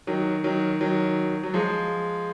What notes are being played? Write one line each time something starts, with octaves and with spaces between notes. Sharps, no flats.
D#3 F#3
D#3 F#3
D#3 F#3
F#3
F3 G#3